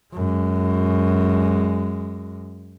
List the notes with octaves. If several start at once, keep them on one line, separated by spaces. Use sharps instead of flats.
F#2 G#3